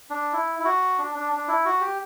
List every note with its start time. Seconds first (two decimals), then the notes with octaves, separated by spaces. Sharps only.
0.10 D4
0.33 E4
0.59 E4
0.65 F#4
0.98 D4
1.15 D4
1.32 D4
1.48 E4
1.65 F#4
1.81 G4